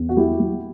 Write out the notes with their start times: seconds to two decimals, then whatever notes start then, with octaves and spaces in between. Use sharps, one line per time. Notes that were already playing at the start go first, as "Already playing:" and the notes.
Already playing: E2
0.09 F#4
0.17 F#3 E4 G4
0.40 F#3